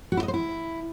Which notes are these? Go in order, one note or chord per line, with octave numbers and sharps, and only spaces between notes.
F#4
E4
D#5
C5
E4